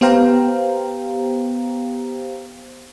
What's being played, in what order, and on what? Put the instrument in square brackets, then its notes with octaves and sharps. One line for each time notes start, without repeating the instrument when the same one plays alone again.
[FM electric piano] B3 G4 C5 F5 G5 A#5